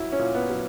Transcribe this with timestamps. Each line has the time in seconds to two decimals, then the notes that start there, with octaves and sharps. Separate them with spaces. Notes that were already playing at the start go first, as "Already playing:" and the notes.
Already playing: F#2 F#3 E4
0.12 C#4
0.19 A#2
0.35 B3
0.50 F#3